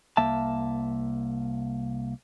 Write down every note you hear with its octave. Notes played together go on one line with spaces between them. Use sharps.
C2 A#3 E5 A5